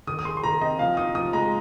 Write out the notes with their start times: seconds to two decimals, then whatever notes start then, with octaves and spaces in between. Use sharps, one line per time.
0.07 D#3 D#6
0.19 D#6
0.25 G#4 C6
0.37 C6
0.43 D#3 A#5
0.61 C4 D#5
0.79 F3 F5
0.97 D#4 D#6
1.15 F3 D#6
1.33 G#3 A#5